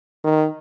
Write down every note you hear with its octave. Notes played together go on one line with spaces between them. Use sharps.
D#3